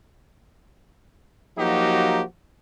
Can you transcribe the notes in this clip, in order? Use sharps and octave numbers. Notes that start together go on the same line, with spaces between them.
F3 F#3 A#3 D#4 F#4 G4